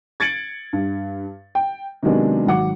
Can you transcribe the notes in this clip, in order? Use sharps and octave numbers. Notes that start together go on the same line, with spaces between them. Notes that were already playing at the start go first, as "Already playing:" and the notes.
G#6 A6 C#7 D7 F#7
G2
G5
C3 D#3 F#3 G#3 B3 D4
G#1 F#3 F#5 D6